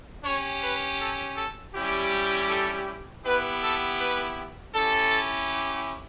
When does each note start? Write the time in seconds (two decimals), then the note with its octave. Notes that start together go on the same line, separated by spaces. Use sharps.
0.25 C#4 G4 C#5
0.63 B4
1.00 A4
1.37 A4
1.74 G3 C#4 E4 G4
2.50 A4
3.25 B3 E4 G4 B4
3.62 A4
4.00 B4
4.74 C#4 E4 G4 A4